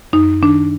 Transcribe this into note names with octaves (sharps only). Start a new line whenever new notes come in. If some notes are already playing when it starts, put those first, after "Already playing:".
F#2 D#4
D#3 D4